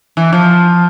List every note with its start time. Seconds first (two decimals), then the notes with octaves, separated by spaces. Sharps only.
0.17 E3
0.33 F3